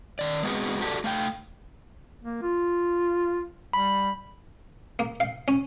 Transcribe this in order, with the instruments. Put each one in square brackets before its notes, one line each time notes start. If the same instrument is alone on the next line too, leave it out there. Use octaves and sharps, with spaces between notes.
[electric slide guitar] D#3 D5
G#3 B3 C4 F#4 G#4
F#4 G4 A4 C#5 D5
A3 F5 G5
[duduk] A#3
F4
[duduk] G3 [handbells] B5
[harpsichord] A#3
F5
C#4